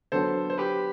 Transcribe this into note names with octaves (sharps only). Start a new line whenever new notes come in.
D3 F#3 B3 A4 C5
C5
G4 B4